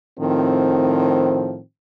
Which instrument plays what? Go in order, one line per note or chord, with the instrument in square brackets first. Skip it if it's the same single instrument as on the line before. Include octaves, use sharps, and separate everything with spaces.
[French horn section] A2 D#3 F3 C4